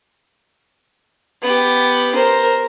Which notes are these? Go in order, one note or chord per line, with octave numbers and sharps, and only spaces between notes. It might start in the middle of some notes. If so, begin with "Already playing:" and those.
B3 G4
A#4 C5